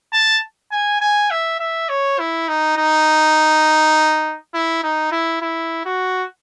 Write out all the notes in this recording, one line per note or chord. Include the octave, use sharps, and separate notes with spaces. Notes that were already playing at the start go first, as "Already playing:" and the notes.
A5
G#5
G#5
E5
E5
C#5
E4
D#4
D#4
E4
D#4
E4
E4
F#4